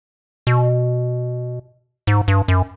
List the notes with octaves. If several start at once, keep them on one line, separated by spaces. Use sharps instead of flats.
B2
G#2
G2
F#2